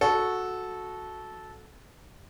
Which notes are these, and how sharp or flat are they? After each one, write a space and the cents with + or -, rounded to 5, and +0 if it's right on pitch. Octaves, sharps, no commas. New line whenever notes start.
F#4 -10 A4 -15